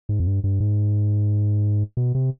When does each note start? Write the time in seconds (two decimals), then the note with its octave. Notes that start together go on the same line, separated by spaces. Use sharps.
0.09 G#2
0.20 F2
0.27 G2
0.44 G2
0.60 G#2
1.97 B2
2.15 C3